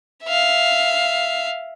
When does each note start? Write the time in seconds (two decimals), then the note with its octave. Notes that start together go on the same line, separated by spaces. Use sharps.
0.24 E5 F5